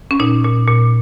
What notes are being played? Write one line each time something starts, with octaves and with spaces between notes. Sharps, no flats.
C#4
A#2 D#4
A#2
A#2